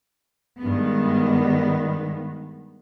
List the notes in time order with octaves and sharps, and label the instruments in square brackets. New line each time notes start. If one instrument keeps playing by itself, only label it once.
[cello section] G2 D#3 G#3 B3